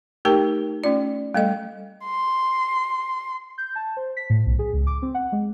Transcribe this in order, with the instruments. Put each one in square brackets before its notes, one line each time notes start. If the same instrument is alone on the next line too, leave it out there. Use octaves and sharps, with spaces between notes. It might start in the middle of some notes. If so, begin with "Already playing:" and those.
[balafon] A3 D#4 G4 A#4 G5 A5
A3 C#4 F4 D5
G3 A3 A4 D#5
[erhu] C6
[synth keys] G6
A5
C5
B6
A2
B1
G#4
C#2
D6
C4
F#5
G#3